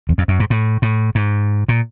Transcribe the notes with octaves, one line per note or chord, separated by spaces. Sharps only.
E2
F2
F#2
G#2
A2
A2
G#2
A#2